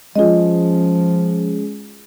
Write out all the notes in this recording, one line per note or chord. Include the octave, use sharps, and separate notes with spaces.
F3 G#3 C#4 F4 G#4 D#5